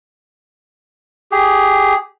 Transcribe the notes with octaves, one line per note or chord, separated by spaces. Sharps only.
G4 G#4